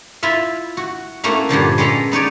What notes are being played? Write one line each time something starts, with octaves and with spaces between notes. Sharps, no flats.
E4 F4 E5
F#4
A3 A#3 C#4 E4 F#4
G2 A#2 D3 F3
G#3 B3 C#4 A4 A#5
B3 D#4 C#5 D5